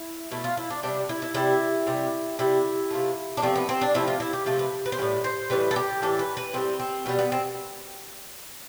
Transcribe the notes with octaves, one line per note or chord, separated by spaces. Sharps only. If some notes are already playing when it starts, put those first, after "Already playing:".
Already playing: E4
B2 A3 E4
F4
E4
D4
C3 G3 D4
E4
E4
C3 G3 E4
C3 G3
C3 G3 E4
C3 F3 A3
D4
C3 F3 A3 C4
B3
C4
D4
C3 F3 A3 E4
F4
E4
G4
C3 F3 A3 A4
B4
B4
C5
A2 E3 G3 B4
C5
A2 E3 G3 B4
A4
G4
A2 E3 G3 A4
B4
B4
A2 E3 G3 C4
C4
B2 G3 B3
B3
C4